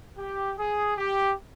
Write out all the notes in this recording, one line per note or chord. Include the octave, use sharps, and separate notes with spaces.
G4
G#4
G4